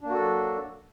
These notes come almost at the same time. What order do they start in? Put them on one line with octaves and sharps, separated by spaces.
D4 A#3 F#4 A4 F#3